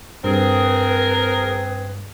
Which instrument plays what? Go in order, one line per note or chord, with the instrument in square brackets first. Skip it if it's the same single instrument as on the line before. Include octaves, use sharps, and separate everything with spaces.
[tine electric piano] G2 [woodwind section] C4 G#4 [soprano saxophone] A#4 [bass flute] B4